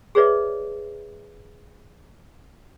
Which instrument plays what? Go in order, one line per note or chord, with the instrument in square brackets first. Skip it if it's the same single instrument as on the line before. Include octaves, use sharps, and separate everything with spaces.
[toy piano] G#4 B4 C#5 D5 E5